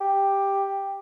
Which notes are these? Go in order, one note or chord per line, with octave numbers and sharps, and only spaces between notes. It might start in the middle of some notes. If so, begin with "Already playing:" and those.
G4